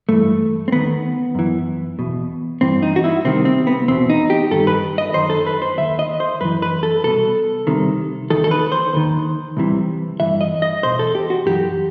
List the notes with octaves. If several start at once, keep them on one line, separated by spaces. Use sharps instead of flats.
G2 E3 A3
C4
D#2 D#3 B3
F#2 E3
E2 B2
G2 E3 C4
D#4
F#4
E4
C2 C3 D#3 C4
C4
B3
E2 B2 C4
D#4
G4
G2 D#3 A4
B4
D#5
F#2 D#3 C5
A4
B4
C5
D#2 D#3 E5
D#5
C5
F#2 E3 B4
B4
A4
C2 B2 A4
C2 C3 D#3
E2 D#3 A4
A4
B4
C5
D#2 D#3
C2 C3 E3
G2 E3 E5
D#5
D#5
E2 B2 C5
A4
G4
F#4
F#2 E3 G4